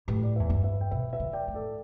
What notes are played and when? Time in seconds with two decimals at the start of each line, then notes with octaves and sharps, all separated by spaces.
0.08 A2 G4 B4
0.23 D5
0.36 E2 B4 E5
0.50 G2
0.63 B4 E5
0.81 G5
0.91 B2 B4 E5
1.13 B4 E5
1.20 D3
1.33 D5 G5
1.48 A2
1.55 A4 D5